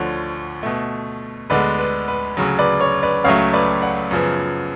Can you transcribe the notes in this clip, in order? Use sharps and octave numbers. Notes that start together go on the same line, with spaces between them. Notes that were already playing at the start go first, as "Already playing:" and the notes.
Already playing: D2 D3 F3 C#5
B2 A3
D2 D3 G#3 B3 B4 D5
B4
B4
D2 C#3 F#3
B4 D5
C#5
B4 D5
C#2 C#3 F#3 A3 C#5 F5
B4 D5
D5 F#5
F#2 C#3 F3 B3